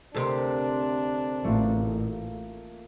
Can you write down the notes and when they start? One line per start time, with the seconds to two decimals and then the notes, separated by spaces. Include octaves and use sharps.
0.14 D2 C3 D4 A4 A#4 C6
1.44 A1 A3 A#3 F4